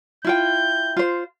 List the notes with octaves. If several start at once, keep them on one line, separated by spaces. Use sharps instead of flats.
E4 F4 G5 G6
F4 C5